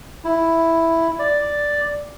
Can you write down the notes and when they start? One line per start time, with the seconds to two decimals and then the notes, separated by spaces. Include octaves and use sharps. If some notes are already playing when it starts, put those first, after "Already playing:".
0.25 E4
1.19 D5